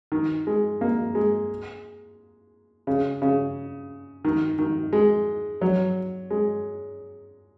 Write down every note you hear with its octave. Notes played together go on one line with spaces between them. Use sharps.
D#3
G#3
A#3
G#3
C#3
C#3
D#3
D#3
G#3
F#3
G#3